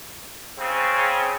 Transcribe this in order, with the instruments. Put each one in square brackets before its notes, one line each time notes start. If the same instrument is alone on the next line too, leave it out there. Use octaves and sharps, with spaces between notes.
[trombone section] C#3 C4